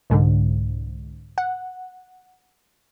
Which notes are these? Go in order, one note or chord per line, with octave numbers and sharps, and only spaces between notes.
C2 G#2 D3
F#5